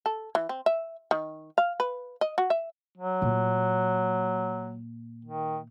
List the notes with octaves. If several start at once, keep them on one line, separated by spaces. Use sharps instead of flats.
A4
E3
C4
E5
D#3
F5
B4
D#5
F#4
E5
F#3
A#2
D#3